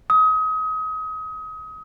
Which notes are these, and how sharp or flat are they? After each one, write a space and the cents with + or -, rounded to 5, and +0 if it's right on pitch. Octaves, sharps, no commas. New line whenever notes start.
D#6 +30